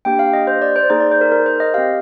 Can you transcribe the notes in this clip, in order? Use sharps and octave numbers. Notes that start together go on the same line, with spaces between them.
A#3 D4 G4 G5
F5
D#5
C5
D5
C5
A#3 D#4 G#4 C5
D5
C5
A#4
A#4
C5
D#5
C4 G4 F5